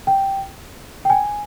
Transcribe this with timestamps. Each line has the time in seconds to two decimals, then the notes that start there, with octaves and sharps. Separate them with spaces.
0.07 G5
1.05 G5
1.10 G#5